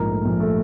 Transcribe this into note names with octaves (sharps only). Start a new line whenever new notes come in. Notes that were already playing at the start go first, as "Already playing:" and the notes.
Already playing: A#1 G#2 F3 A#4
A3
A#1
A3